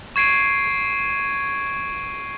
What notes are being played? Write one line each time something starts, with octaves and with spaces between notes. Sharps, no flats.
C#6 G#6 C7 D7 D#7